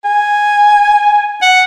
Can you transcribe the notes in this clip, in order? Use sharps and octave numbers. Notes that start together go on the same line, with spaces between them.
G#5
F#5